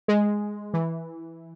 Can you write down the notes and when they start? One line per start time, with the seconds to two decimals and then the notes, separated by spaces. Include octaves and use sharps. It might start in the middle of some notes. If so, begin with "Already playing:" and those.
0.08 G#3
0.74 E3